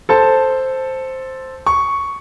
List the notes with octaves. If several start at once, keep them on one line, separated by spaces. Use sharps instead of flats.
A4 C5 A5
C#6